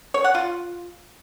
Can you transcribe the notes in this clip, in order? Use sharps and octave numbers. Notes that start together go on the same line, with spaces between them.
C#5
F#5
F4